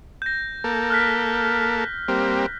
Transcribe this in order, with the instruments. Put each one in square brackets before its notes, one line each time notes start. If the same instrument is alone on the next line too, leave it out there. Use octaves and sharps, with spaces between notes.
[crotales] G6 A#6
[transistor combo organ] A#3 A4
[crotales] F6 F#6 B6
[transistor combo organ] G3 A#3 C4